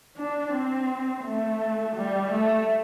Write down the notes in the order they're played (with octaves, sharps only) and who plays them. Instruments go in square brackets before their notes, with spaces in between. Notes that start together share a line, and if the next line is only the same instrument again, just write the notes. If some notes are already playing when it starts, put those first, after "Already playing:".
[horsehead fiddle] D4
C4
A3
G3
A3